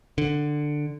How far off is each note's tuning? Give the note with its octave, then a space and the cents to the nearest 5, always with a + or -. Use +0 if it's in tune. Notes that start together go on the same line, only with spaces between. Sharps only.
D3 +10